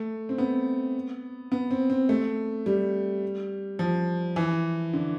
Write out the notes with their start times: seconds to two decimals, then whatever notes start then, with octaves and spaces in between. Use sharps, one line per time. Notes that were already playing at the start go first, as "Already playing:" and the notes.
Already playing: A3
0.29 C4
0.38 B3
1.52 B3
1.71 C4
1.90 C4
2.09 A3
2.66 G3
3.79 F3
4.36 E3
4.93 D3